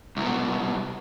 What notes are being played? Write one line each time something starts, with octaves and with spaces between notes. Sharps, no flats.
C2 B2